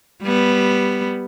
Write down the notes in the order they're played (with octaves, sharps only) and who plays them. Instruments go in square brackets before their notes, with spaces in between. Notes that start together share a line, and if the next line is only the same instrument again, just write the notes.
[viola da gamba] G3 B3